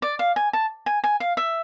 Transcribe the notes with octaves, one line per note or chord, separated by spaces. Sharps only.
D5
F5
G#5
A5
G#5
G#5
F5
E5